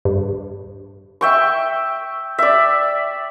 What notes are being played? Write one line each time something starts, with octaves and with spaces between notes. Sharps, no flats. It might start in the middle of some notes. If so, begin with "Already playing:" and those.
G2
E5 G5 C#6
D5 E5